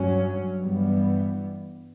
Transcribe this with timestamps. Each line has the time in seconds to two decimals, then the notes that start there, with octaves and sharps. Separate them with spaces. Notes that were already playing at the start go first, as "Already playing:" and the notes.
Already playing: G2 F#3 C#4
0.61 G2 E3 G3 B3